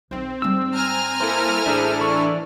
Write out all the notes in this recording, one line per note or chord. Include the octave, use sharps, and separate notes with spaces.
B1 D#3 C4
G#2 G3 E6
G#5 A#5 F6
A#3 E4 A4 C5
A1 D4 E4 G#4 A4 C5 E5
E3 D5 C#6